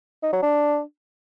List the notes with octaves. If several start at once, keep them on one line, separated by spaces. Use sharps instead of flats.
D#4
F#3
D4